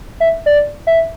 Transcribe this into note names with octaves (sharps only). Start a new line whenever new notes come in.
E5
D5
E5